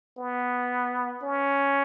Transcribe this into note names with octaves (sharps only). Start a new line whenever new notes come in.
B3
C#4